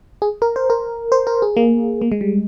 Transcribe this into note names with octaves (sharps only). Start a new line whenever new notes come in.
G#4
A#4
C5
A#4
C5
A#4
G#4
A#3
A#3
G#3
G3